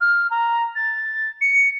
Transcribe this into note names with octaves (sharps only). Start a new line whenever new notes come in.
F6
A#5
A6
C#7